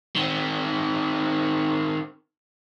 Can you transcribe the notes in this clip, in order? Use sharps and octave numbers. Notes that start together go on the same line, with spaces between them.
D#3 C4